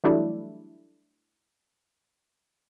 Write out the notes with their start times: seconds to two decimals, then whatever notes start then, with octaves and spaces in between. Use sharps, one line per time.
0.04 E3 F#3 G3 A3 D4 E4